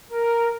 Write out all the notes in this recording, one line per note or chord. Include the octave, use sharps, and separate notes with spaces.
A#4